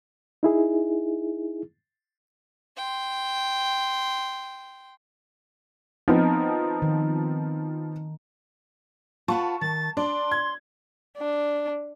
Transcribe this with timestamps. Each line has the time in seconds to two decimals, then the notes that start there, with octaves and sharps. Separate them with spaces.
0.43 D#4 E4 G#4
2.77 G5 C6
6.08 F3 B3 C4 D#4
6.82 D#3
9.28 F4 B4 F#5 A5 C#6
9.61 D#3 A6
9.97 D4 D5 C6
10.32 G#6
11.18 D4